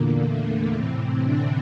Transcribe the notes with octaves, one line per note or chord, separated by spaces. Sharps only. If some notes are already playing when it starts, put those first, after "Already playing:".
Already playing: E2 A#2 D3 A#3
A3
A2 C3 E3 C4
D3 D4